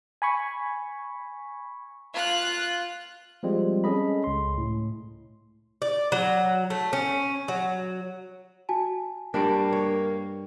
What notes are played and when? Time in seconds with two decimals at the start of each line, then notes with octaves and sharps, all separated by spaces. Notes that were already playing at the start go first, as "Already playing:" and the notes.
0.22 G#5 B5 C#6
2.14 F4 F#6
3.43 F3 G3 G#3 C4 F4
3.84 C#4 G#4 A4 D#5 B5
4.24 C#2 C6
4.58 A2
5.82 D5
6.12 F#3
6.70 A3
6.93 C#4
7.48 F#3
8.69 F#4 G#5 A5
9.34 G2 G3 A#3 D4
9.73 C#5